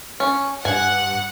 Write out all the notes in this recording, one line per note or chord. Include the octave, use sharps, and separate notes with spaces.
C#4
G2 F#5 G#5